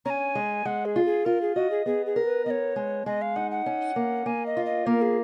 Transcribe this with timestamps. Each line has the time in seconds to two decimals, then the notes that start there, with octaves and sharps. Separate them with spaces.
0.05 C#4 G#5 A#5
0.35 G#3
0.65 G#3 F#5
0.85 G#4
0.96 F4
1.06 G#4
1.25 F4 A#4
1.41 G#4
1.55 F#4 D#5
1.70 G#4
1.86 B3 G#4
2.06 G#4
2.16 A#4
2.25 B4
2.46 B3 C#5 D#5
2.76 G#3
3.06 G#3 D#5
3.22 F5
3.36 D#4 F#5
3.51 F#5
3.66 C#4
3.96 A#3
4.26 A#3 G#5
4.46 D#5
4.57 F4
4.66 D#5
4.86 A#3 A#4
5.02 G#4